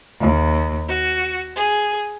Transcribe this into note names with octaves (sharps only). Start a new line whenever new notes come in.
D#2
F#4
G#4